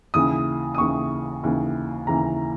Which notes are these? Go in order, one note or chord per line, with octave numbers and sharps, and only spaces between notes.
D#2 C#3 E3 D#6
D#6
D#2 C#3 E3 C#6
D#2 C#3 E3
D#2 C#3 E3 A#5